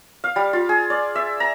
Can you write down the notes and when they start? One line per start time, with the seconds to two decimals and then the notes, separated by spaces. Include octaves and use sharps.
0.24 F5
0.36 G3
0.53 F4
0.69 G#4
0.90 D5
1.15 E5
1.40 A#5